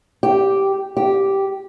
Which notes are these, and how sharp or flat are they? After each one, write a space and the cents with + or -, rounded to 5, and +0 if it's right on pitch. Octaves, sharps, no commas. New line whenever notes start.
G4 -5
G4 -5